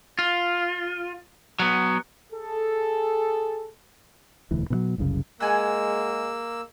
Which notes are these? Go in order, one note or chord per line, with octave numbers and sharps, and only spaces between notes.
F4
F#3 B3
G#4 A4
E1 D2 E3
B2 E3 F#3
F#1 C2 F#2 C#3
G#3 A#3 F#5 G#5 E6